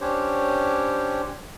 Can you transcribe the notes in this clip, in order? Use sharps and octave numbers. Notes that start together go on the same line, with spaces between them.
C#4 D4 G4 C5 C#5